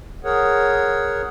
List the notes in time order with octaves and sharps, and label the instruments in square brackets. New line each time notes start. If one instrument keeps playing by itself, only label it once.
[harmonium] G#4 A#4 C#5 F#5